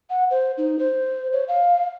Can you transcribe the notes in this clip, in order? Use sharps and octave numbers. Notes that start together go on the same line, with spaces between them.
F#5
C5
D#4
C5
C#5
F5